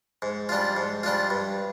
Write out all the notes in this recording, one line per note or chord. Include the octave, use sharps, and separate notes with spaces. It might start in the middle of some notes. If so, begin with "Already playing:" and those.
G#2
G3 D4 F4
G#2
G3 D4 F4
G2